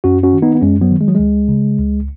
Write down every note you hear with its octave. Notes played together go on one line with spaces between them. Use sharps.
F#2 C#4 F#4
C#4 F#4
D#3
B3 D#4
B3
F#2 G#3 C#4
F#3 B3
D#3
G#3
F#3
C#2 G#3
C#3
C#2